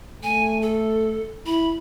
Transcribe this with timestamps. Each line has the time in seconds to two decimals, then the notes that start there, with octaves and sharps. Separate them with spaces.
0.23 A3 G#5
0.62 A4
1.46 E4 B5